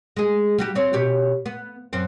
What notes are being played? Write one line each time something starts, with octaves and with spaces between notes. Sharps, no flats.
G#3 G#4
G3 F#4 G4
C4 C#5
B2 G4 C#5
B3
F#2 C4